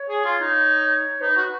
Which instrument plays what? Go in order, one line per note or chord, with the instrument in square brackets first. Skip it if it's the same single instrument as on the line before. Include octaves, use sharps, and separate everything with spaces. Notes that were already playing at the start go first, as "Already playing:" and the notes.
Already playing: [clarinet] C#5
[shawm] G#4
F4
D#4
[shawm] D#4 [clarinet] B4
[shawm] F#4